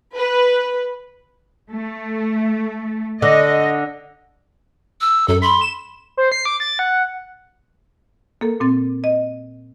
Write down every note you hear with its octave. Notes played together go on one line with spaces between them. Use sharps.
B4
A3
D3 D#5
E6
F#2 A4
B5 C6
E7
C5
C7
D6
A6
F#5
A#3 A4 A#4
A#2 C4 A6
D#5